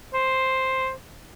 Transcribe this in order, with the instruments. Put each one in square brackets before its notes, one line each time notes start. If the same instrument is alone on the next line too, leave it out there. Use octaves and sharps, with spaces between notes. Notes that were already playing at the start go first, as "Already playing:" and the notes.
[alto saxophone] C5